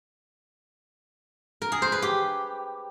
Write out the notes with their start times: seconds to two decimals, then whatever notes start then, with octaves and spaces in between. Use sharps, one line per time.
1.62 A#4
1.72 G#4
1.82 C5
1.92 B4
2.02 G4